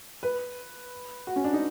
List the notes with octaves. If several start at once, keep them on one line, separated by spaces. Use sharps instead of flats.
B4
F#4
C#4
D4
D#4